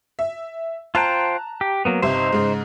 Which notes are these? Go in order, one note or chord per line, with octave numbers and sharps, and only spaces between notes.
E5
F4 C5 G5 A5 A#5 F#6
G4
F#3 A#3 B3
G1 C3 D#4 C5 E5
G#2 C#3